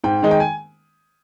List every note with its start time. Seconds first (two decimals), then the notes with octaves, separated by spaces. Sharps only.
0.04 G#2 G5
0.23 D#3 G#3 D#4
0.31 G5
0.40 G#5